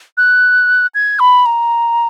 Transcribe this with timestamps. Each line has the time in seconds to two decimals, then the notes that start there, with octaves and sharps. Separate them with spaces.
0.17 F#6
0.94 G#6
1.19 B5
1.46 A#5